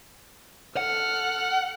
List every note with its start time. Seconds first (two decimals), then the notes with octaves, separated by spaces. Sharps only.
0.77 A4 F#5 F6